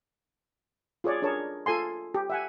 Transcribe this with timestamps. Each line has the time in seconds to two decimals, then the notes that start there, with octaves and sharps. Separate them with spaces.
1.04 F4 G#4 C#5 D5
1.22 D4 G#4 A#4 C#5 A5
1.66 F4 A4 G#5 C6
2.14 G4
2.30 E5 F#5 G#5